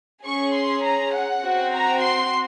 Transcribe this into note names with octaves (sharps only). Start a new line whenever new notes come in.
C#4 G#4 C#6
C6
A#5
F#5
C4 F#4
A#5
C6